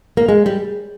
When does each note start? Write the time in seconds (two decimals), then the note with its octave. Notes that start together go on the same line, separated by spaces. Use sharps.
0.17 A#3
0.28 G#3
0.46 G3